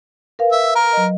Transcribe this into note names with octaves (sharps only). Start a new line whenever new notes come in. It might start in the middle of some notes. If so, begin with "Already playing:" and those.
A#4 B4 F5
E5
A#4
F#3 D#5